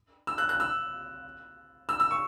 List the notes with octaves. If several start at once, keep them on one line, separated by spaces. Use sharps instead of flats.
E6
F#6
F#6
E6
E6
E6
C#6